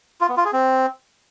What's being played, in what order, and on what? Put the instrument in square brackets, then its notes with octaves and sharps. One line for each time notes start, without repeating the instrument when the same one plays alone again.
[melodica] F4
B3
F4
G#4
C4